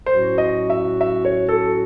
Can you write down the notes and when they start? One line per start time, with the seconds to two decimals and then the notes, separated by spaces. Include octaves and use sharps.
0.06 A2 F#3 C#4 F#4 C5
0.38 D#5
0.70 E5
1.01 E5
1.25 C#5
1.49 A4